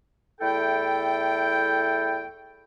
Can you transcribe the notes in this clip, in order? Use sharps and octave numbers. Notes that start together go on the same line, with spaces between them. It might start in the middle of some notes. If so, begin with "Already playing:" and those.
E2 A3 E4 A4 G5